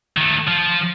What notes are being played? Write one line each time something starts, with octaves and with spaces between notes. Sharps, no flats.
D#3 A3
F3